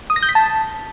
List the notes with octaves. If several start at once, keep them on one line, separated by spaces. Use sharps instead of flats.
D#6
A#6
G6
B6
A5